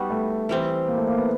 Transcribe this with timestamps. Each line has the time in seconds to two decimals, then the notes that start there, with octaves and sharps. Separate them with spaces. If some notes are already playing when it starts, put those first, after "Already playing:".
Already playing: G3 B3 D#4 F#4
0.10 A3
0.49 E3 G3 C4
0.88 A#3
0.98 A3
1.08 A#3
1.17 B3